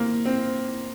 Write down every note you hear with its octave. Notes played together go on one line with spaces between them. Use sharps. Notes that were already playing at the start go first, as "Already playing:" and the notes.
Already playing: A#3 C4
C4